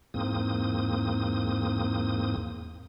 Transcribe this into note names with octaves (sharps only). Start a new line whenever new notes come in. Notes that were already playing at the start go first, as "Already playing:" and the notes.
E2 G#2 A#3 C4 D#6